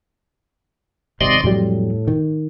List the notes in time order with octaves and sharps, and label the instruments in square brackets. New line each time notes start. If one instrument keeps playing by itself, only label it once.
[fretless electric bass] G#1 C3 [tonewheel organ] D5 D#5 C6
[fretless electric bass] F2 F#3 G3 [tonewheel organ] A2
[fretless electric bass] D#3